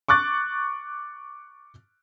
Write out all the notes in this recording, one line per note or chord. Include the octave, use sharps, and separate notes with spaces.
C#6 D6 F#6 A6